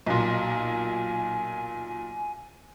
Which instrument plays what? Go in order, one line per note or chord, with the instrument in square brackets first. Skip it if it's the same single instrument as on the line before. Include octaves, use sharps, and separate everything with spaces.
[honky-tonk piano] B1 A#2 [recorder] G#5